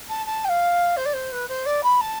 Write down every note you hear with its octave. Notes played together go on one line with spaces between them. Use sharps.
A5
A5
G5
F5
C5
D5
C5
B4
C5
D5
B5
A5